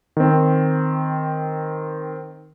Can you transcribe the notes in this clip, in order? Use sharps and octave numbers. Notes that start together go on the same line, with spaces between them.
D#3 C4